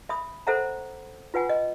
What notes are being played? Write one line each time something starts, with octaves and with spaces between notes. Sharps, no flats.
E5 B5 D#6
A4 C5 E5 F#5 A#5
F4 B4 F#5 G#5
D#5